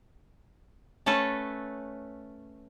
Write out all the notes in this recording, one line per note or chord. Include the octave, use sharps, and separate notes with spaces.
A3 C#4 A4 B4 A5